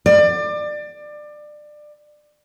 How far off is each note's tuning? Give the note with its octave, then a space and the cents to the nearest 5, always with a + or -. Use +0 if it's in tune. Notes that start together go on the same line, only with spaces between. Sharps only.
D5 +25